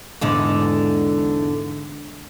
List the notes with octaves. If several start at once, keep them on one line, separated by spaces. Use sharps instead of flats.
E2 G#2 D3